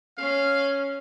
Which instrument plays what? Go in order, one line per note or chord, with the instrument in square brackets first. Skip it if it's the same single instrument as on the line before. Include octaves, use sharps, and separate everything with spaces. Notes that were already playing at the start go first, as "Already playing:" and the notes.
[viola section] C#4 [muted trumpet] F5